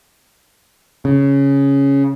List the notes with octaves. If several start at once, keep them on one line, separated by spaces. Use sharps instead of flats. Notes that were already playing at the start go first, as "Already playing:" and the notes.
C#3